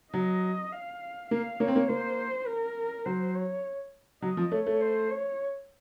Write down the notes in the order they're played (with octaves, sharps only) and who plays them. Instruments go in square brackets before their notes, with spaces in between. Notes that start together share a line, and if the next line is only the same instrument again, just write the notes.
[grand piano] F#3 [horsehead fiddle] D#5
[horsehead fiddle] F5
[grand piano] A#3 [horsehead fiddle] F5
[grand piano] A#3 [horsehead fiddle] C#5
[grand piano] C4
A#3
[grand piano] A#3 [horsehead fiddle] C5
[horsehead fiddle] A#4
[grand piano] F#3 [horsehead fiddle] C5
[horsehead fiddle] C#5
[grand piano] F#3 [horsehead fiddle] D#5
[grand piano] F3
[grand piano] A3 [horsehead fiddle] C#5
[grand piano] A3
[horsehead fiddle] C5
C#5